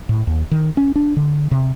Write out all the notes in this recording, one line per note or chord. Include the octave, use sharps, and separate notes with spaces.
A2
D#2
D#3
C#4
D4
D3
C3